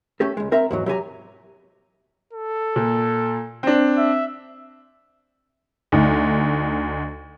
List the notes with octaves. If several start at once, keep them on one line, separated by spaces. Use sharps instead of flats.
A3 C#4 G4 A4
C#2 G#3
C4 A#4 E5 A#5
E2 G#2 F#3
F#3 G4 G#5 A#5
A4
A#2
C4 D4
E5
D2 D#4